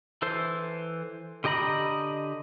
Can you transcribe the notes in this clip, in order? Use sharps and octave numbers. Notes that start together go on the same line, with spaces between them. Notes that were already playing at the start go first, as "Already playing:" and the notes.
E3 A4 C5
D3 G4 D#5 A#5 B5